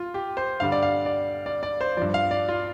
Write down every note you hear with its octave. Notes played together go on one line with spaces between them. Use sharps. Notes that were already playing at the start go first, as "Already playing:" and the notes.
Already playing: F4
G4
C5
G2 D3 G3 F5
D5
F5
D5
D5
D5
C5
G2 F3 D5
F5
D5
F4